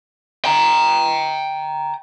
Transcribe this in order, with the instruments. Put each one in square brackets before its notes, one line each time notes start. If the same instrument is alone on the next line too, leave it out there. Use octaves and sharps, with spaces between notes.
[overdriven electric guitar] G5 A#5